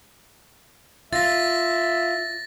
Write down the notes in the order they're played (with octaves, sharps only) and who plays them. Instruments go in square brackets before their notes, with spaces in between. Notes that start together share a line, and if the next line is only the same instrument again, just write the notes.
[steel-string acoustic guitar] F4 [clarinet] E5 [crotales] A6 A#6